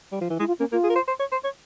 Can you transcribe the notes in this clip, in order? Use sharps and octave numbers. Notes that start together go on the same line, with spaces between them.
G3
F3
E3
G#3 E4
F4
A#3 C#4
A#3 F4
G#4
A#4
C5
C5
C#5
C5
C#5